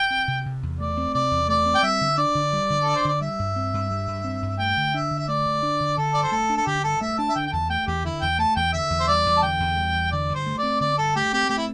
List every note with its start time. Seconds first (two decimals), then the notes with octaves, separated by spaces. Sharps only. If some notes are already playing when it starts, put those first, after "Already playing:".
Already playing: G5
0.10 C4
0.28 C3
0.46 C3
0.63 E2
0.79 A3 D5
0.97 C4
1.14 C3 D5
1.31 E2
1.48 A3 D5
1.65 C4
1.75 G5
1.83 G3 E5
2.01 D3
2.18 D4 D5
2.35 D3
2.53 G3
2.70 D3
2.82 D4 A4
2.95 C5
3.05 D3 D5
3.21 G3 E5
3.39 G2
3.56 C4
3.74 G2
3.91 G3
4.08 G2
4.24 C4
4.42 G2
4.59 A3 G5
4.77 D3
4.94 D4 E5
5.11 D3
5.19 E5
5.28 A3 D5
5.46 D3
5.63 D4
5.80 D3
5.97 D3 A4
6.14 G2 D5
6.23 C5
6.31 A3 A4
6.50 D4
6.57 A4
6.67 D3 G4
6.84 G2 A4
7.01 A3 E5
7.18 D4 A5
7.29 E5
7.36 D3 G5
7.47 G5
7.52 E2 A5
7.70 A3 G5
7.87 E2 G4
8.04 D3 E4
8.22 E2 G5
8.39 A3 A5
8.56 E2 G5
8.73 D3 E5
8.90 E2
9.00 C5
9.08 G3 D5
9.26 E2
9.37 A5
9.42 D3 G5
9.60 E2
9.77 G3
9.94 E2
10.11 D3 D5
10.29 G2
10.35 C5
10.46 A3
10.58 C4 D5
10.80 D3 D5
10.98 G2 A4
11.16 A3 G4
11.33 C4 G4
11.49 A3 G4
11.58 E4